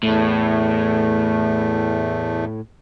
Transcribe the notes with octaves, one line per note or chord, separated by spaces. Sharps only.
E2 A2 A3